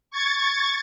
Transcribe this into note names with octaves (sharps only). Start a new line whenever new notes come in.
C#6 G#6 A6